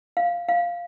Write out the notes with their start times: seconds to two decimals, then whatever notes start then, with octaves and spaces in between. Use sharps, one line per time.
0.17 F5
0.49 F5